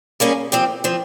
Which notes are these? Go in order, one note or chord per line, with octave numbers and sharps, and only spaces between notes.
G3 A#3 C#4 G#4
F3 C4 G4
F3 C4